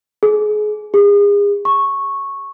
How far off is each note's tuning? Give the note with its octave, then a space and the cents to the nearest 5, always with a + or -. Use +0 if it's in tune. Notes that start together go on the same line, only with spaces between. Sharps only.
G#4 +30
G#4 -35
C#6 -10